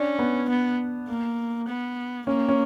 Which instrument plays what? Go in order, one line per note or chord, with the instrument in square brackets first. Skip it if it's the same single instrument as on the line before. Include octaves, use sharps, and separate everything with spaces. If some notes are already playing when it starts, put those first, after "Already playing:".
Already playing: [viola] C#4 [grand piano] D4
[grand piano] B3
[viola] B3
A#3
B3
[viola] A#3 [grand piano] C#4
[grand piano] C#4